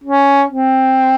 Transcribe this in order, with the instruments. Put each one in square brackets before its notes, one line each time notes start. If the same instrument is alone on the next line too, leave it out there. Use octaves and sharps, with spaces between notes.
[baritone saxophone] C#4
C4